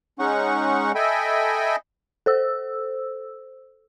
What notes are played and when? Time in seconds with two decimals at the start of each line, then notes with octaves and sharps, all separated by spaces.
0.19 G#3 C#4 D#4 F#5 C#6
0.95 A4 D#5 E5 G5 G#5 B5
2.26 A4 C5 E6